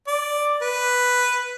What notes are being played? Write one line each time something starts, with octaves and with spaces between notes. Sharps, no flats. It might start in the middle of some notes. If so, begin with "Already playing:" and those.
D5
B4